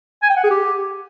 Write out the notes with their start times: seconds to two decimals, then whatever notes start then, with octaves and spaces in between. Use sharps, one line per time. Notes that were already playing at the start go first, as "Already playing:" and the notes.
0.23 G#5
0.30 G5
0.37 F#5
0.44 G#4
0.50 G4